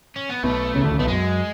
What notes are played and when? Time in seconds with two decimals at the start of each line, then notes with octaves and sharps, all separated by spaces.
0.16 C#4
0.29 B3
0.43 B1 B2 A3
0.75 C#2 C#3
0.83 D2 D3
0.91 C#2 C#3
0.99 B1 B2 A3
1.07 F#2 G#3